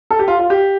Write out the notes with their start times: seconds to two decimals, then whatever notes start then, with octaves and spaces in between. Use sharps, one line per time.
0.11 A4
0.19 G4
0.28 F4
0.39 F4
0.50 G4